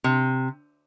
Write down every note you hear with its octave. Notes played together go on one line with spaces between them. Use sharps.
C3